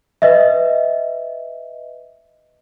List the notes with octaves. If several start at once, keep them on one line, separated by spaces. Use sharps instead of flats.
B4 D#5 E5